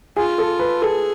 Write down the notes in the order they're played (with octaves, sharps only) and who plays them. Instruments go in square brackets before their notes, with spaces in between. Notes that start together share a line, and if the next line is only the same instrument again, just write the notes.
[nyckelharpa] F4 [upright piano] G#4
[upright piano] A4
B4
[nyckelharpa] G#4 [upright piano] A4